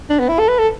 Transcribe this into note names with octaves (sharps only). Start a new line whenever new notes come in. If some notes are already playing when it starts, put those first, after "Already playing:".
D4
B3
E4
A4
B4
A4